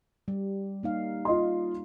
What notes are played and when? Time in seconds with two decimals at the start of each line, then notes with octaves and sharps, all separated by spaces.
0.28 G3
0.83 A#3 D#4 F5
1.25 F4 D#5 C6